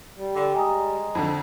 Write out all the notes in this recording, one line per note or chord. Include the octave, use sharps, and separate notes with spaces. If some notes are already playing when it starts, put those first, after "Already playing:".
G3
D3
G#3 G#5 A#5 D#6
F2 D3 A5